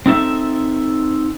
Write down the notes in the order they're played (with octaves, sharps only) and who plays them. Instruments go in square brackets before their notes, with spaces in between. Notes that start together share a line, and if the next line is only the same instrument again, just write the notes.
[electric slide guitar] C4 D#4 A4 E5